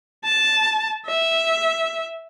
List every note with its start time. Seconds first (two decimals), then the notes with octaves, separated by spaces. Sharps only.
0.24 A5
1.06 E5